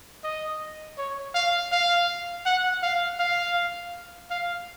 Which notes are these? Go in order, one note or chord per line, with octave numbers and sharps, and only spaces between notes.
D#5
C#5
F5
F5
F#5
F5
F5
F5